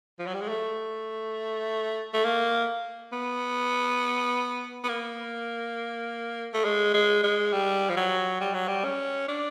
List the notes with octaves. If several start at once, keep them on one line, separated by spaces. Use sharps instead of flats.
F3
F#3
G3
G#3
A3
A3
A#3
B3
B3
A#3
A3
G#3
G#3
G#3
G3
F3
F#3
G3
F#3
G3
C#4
D4